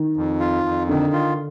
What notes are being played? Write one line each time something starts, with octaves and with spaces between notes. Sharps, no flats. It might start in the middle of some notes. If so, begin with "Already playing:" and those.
Already playing: D#3
F2
F4
F2
D3 D#3
F4